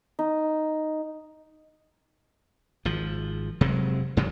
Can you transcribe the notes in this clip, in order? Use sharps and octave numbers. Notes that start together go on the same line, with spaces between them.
D#4
G#1 F3
F1 C3 F#3 G#3
G2 C#3 F3 F#3